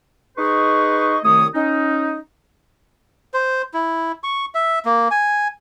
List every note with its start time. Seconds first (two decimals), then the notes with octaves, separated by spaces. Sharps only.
0.38 D#4 G#4 B4 C5 D#5 C#6
1.24 C2 D#3 A3 C#5 D#6
1.54 C#4 D#4
3.34 C5
3.74 E4
4.23 C#6
4.55 E5
4.85 A#3
5.11 G#5